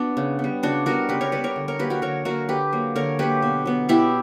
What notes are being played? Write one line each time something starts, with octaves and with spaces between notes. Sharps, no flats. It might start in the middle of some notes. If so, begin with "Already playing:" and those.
Already playing: B3 D4 F#4
C#3
B3
G3
C#3 D4 F#4
G3 B3 F#4 A#4
C#3 G4 B4
A#4 C#5
G3 B3 B4 D5
A#4 C#5
D3
A#4 C#5
F#3 A#3 G4 B4
F#4 A#4
D3 A#4 C#5
F#3 A#3 F#4 A#4
D3 G4 B4
F#3 A#3
D3 A#4 C#5
F#3 A#3 G4 B4
B2
F#3 B3
B2 E4 G4